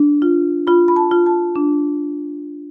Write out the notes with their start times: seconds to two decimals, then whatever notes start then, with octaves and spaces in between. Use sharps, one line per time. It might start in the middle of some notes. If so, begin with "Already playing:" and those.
Already playing: D4
0.22 F4
0.67 F4 B5
0.88 B5
0.96 A5
1.11 F4
1.26 A5
1.56 D4